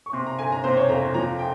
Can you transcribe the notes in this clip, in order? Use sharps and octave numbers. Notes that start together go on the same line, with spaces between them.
C#6
C3 C6
A#5
G1 G#5
A#5
C3 C5
C#5
F2 A#5
F3 A#5
G5